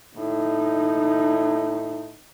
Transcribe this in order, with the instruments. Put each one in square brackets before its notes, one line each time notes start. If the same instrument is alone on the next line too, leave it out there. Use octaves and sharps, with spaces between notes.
[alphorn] A2 [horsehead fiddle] D#4